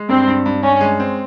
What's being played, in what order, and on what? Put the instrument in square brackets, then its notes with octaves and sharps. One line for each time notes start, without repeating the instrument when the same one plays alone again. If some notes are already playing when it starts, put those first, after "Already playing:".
Already playing: [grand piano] G#3
[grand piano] G2 [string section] C4
[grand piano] G2
G2
[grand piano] G2 [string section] C#4
[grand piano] G#3
C4